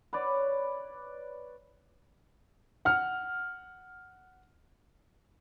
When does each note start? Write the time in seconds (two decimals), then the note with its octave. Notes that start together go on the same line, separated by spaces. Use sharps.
0.13 B4 C#5 D5
2.85 F#5 F6